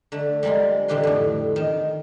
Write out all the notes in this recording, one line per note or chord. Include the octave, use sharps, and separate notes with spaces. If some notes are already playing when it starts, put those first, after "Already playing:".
D3 A3
G3 G#3 A#3 C4 F4
A#2 D3 D#3 G4 B4 C6
F2 A2
D#3